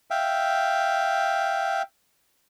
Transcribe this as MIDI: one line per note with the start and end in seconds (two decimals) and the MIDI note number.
0.11 1.82 76
0.11 1.82 77
0.11 1.82 79